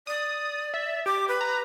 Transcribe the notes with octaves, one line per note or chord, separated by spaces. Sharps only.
D5 D#6
E5
G4 D6
B4
A#5